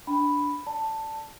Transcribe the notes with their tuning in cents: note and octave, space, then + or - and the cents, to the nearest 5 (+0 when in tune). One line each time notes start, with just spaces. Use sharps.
D4 -10 B5 +0
D5 +0 A5 +10